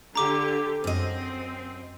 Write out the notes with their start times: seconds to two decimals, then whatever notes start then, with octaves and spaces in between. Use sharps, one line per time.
0.15 D3 G4 A#5 D6
0.84 F#2 C4 D#5